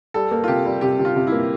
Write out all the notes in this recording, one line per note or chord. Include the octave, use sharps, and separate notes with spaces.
G3 A4
A#3
F4
C3 G4
G3
C3 G4
C3
F4
C3
E4
A#3